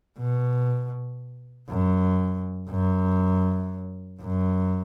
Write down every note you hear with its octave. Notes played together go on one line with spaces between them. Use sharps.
B2
F#2
F#2
F#2